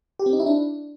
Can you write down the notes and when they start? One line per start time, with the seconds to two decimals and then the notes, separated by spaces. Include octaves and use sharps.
0.19 G4
0.26 C4
0.33 D#4
0.40 E4
0.46 D4